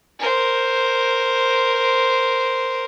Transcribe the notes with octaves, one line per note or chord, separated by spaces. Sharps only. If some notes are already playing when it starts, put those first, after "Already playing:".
A#4 C5